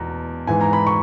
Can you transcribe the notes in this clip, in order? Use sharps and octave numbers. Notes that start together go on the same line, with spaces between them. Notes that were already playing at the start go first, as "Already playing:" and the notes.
Already playing: E2 B2 A#5
G#2 E3 G#5
A#5
B5
C#6